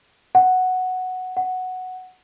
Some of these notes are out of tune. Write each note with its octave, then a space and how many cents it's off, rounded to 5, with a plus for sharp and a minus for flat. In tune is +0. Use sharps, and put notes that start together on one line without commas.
F#5 +0
F#5 +0